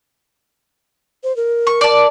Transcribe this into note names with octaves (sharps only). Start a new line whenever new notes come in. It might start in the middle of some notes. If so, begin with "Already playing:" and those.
C5
A#4
C#6
D5 A5